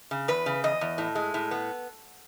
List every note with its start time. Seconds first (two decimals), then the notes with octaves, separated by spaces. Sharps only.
0.11 C#3
0.28 E2 B4
0.46 C#3
0.64 E2 D#5
0.81 E2
0.98 A2
1.15 G#3
1.34 A2
1.51 B3